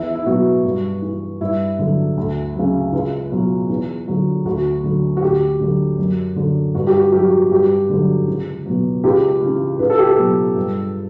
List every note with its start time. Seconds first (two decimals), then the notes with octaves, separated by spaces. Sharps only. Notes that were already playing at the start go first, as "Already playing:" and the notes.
Already playing: E2 E4
0.15 E4
0.26 B2 F#3 F#4
0.64 G2
1.02 E3
1.41 G2 E4
1.79 D3 F#3
2.17 D2
2.55 C#3 F#3
2.93 C#2
3.31 B2 F#3
3.69 E2
4.08 D3 F#3
4.45 D2 F#4
4.84 D3 F#3
5.17 F#4
5.22 D2 G4
5.60 D3 F#3
5.98 F#2
6.36 D3 F#3
6.75 G2 F#4
6.87 G4
6.99 F#4
7.12 F#3 G4
7.24 F#4
7.52 G2 G4
7.90 D3 F#3
8.28 C#2
8.66 B2 F#3
9.04 C#2 G4
9.42 C#3 E3
9.79 C#2 B4
9.90 A4
9.99 G4
10.08 A4
10.18 B2 F#3
10.57 G2